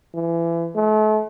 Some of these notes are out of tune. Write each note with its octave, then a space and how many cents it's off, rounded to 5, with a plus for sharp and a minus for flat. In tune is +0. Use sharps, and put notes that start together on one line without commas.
E3 +30
A3 -40